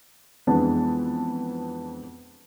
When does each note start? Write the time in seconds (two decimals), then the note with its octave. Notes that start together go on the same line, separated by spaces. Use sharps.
0.47 F2 E3 G#3 B3 D4 A5